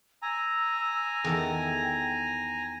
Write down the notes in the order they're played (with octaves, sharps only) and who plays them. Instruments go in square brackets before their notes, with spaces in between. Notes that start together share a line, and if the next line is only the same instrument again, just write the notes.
[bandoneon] G#5 A#5 [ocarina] E6
[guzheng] E2 D#3 A4 [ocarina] G5